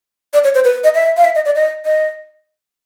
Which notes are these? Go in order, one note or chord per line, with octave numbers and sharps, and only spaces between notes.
D5
C#5
C5
B4
D#5
E5
F5
E5
D#5
D5
D#5
D#5